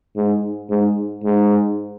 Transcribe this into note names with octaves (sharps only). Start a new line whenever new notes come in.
G#2
G#2
G#2